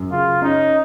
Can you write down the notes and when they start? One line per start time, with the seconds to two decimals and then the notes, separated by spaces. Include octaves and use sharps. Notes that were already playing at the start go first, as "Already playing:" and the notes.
Already playing: F#2
0.11 C#3 F4
0.42 C#4 D#4